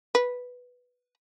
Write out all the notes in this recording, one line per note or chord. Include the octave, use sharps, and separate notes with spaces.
B4